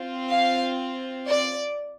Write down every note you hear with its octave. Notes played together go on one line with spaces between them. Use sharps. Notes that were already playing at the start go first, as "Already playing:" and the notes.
Already playing: C4 F4
F5
D5